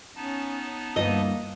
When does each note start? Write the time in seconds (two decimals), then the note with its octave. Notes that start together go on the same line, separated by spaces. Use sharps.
0.16 B3 C#4 D#4 A5
0.96 D2 G2 E3 A#3 D#5